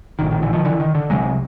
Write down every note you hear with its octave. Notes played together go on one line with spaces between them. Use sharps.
A#1 A2 D#3
D#3
D3 E3
D#3 F3
D3 E3
D#3
D3
C2 C3 F#3 G#3